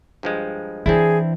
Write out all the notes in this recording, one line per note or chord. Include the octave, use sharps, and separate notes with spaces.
G2 F3 G#3
E3 C4 D4 E4 G#4